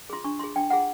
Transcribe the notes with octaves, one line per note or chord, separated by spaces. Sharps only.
F4 G#4 C6
D4 C#6
F4 G#4 C6
D4 G5
F4 G#4 F#5